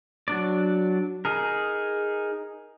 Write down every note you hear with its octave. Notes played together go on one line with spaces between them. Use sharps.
F#3 D4 D5
D#4 G#4 A#4